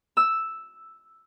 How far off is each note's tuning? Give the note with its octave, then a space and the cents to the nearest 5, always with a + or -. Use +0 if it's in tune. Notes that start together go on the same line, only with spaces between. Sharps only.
E6 +0